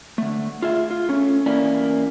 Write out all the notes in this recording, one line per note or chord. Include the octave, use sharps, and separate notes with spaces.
D3 A3
F4 G#4 E5
F4
A3 C#4
E2 A#3 C#4 E4 D5 G#5